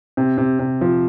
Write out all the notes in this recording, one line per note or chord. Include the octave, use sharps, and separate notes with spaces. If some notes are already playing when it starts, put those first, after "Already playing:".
C3
C3
C3
F3